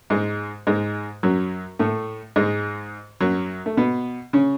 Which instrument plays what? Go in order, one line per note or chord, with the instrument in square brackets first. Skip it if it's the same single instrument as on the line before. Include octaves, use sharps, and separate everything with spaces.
[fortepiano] G#2 G#3
G#2 G#3
F#2 F#3
A2 A3
G#2 G#3
F#2 F#3
A3
B2 B3
C#3 C#4